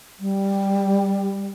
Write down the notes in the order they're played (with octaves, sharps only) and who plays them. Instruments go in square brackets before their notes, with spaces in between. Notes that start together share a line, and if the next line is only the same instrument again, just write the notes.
[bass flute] G3